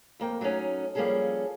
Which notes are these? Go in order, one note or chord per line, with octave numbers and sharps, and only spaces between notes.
F2 A#3 G5
F#3 A3 C4 C#4 D#4
F3 G3 A#3 C#4 G#4 A4